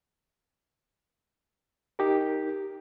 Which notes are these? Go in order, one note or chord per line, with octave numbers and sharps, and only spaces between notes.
D#4 G4 A#4